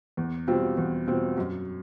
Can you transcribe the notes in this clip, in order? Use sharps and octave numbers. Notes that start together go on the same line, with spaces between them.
E2
B2 G3 C4 F4
E2
B2 G3 C4 F4
F#2